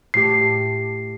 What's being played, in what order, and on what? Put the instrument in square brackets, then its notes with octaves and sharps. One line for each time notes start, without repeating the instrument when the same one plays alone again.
[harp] A2 A3 G4 [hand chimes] C7